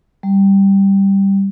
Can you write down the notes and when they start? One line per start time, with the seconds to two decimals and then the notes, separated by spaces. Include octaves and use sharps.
0.23 G3